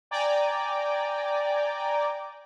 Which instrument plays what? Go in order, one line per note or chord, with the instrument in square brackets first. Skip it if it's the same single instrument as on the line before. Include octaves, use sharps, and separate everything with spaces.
[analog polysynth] D5 G5 G#5 A#5 D6